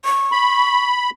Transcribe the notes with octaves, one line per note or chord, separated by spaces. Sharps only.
C#6
B5